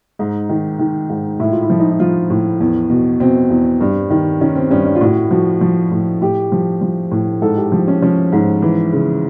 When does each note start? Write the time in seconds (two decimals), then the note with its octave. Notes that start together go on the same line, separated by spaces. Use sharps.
0.19 G#2 D#4
0.49 D#3
0.79 D#3
1.09 G#2
1.40 A2 E4
1.52 F4
1.63 E4
1.70 F3
1.79 D#4
1.90 E4
2.00 F3 F4
2.30 A2
2.60 E2
2.90 B2
3.20 B2 C4
3.50 E2
3.81 G2
4.10 D#3
4.41 D#3 C#4
4.56 C4
4.71 G2 C#4
4.86 D4
4.95 F4
5.01 A2 F#4
5.31 F3 F#4
5.61 F3
5.92 A2
6.21 A2 G4
6.52 F3
6.81 F3
7.11 A2
7.42 G#2 A4
7.57 G4
7.72 F3
7.88 C#4
8.02 F3 C#4
8.32 G#2
8.62 E3
8.93 C#3